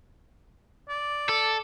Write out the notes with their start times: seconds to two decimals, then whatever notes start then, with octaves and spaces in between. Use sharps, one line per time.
0.89 D5
1.29 A4